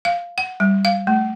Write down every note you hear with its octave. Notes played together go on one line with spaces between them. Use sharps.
F5
F#5
G3
F5
A3